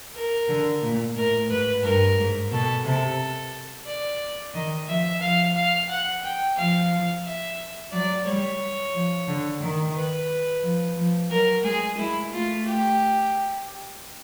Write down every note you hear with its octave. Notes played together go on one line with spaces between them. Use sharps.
A#4
D3
A#2
A2 A#4
G#2 B4
G2 A#4
G#2
B2 A4
C3 A4
D5
D#3 D#5
F3 E5
F3 F5
F5
F#5
G5
F3 F5
E5
F#3 D5
G3 C#5
F3
D3
D#3
B4
F3
F3
F#3 A#4
G#3 G#4
G#3 E4
A3 F4
G4